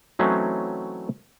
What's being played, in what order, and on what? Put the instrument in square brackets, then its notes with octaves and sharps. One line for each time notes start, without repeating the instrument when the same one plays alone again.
[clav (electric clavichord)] E3 F#3 A3 C4 C#4 D#4